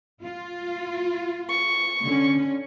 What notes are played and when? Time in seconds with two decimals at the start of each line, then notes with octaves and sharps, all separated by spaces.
0.22 F4
1.50 C#6
2.03 D3 C#4